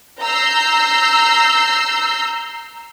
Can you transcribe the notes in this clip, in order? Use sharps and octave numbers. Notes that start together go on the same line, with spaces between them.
A#5 E6 G6 C7